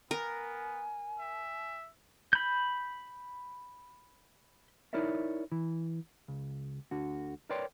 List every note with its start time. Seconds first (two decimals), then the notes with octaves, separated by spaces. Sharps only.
0.11 B3 A#4 G#5
1.19 E5
2.33 B5 G6
4.93 D#4 E4 A#4 C#5 D5 E5
5.52 E3
6.28 C#2
6.91 D2 D3 F#4
7.49 A#4 B4 C#5 D5 G5 C6